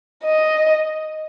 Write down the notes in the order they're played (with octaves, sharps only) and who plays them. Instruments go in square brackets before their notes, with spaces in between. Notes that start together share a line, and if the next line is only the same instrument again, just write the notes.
[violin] D#5